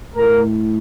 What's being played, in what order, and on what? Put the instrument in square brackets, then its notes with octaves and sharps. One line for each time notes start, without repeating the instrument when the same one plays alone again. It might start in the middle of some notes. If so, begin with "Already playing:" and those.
[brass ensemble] A2 A#4